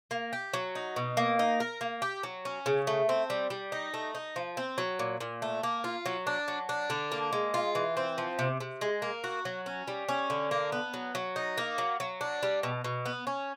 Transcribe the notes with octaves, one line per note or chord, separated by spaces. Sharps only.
A#3
G4
F#3
D#4
B2
A#3
D#4
A#4
A#3
G4
F#3
C#4
C#3
A3
C4
G3
G3
D#4
A3
D#4
F3
C4
F#3
A#2
A#2
A3
A#3
F4
F#3
D4
F#3
D4
D3
A#3
G#3
F4
E3
C4
F3
C3
C3
G#3
A#3
F#4
F#3
C#4
G3
C#4
D3
A#3
B3
F#3
F#3
D#4
A#3
F#3
F#3
D4
G3
B2
B2
B3
C#4